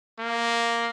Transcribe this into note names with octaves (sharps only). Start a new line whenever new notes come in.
A#3